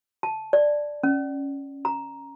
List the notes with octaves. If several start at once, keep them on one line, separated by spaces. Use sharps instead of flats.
A5
D5
C#4
A#5